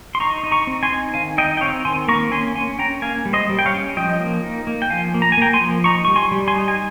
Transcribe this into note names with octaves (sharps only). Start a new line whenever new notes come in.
C6
D#4 A#5 C#6
D#4
A#5 C#6
C4
G#5 C6
D#4
D#3 F5 G#5
D#4 D#5 G5
G5
C4 C#5 F5
D#3 G#5 C6
A#3 A#5 C#6
C#4 G#5 C6
C#4 G#5 C6
C#4 G5 A#5
A#3 F5 G#5
G3
C5 D#5
G3
G5
C#5 F5
C#4
F3 D#5 G5
A#3
D#4
A#3
G5
F3 F5 G#5
A#3
A#5
G#5
A#3 G5 A#5
G#5 C6
F3
D#4 A#5 C#6
G3 C#6
G#5 C6
G3
G#5 C6
D#4
G#5